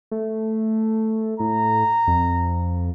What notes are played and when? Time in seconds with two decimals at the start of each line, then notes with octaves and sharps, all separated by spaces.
0.11 A3
1.40 A2 A#5
2.07 F2